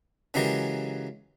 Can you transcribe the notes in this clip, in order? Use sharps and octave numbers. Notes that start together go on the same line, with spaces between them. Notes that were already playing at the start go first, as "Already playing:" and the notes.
C#3 E3 F#3 G#3 G4 A#4